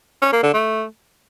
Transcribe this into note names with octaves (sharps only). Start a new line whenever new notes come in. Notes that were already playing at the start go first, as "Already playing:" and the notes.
C#4
A#3
D3
A3